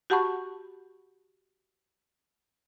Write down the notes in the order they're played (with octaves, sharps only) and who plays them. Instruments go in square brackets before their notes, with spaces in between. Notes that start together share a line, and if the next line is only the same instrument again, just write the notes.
[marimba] F#4 G4 F#5 A5 B5 C#6